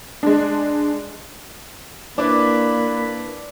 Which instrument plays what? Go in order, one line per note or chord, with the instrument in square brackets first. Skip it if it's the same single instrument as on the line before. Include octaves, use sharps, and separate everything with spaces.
[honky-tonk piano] G#3 D4
[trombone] A#3 [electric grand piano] D4 E4 B4 [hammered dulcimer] D5 [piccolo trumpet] B5